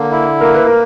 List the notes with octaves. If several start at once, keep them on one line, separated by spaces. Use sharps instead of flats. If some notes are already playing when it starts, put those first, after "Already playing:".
Already playing: D3 A#3
E4
A#3 A#4
B4
A#4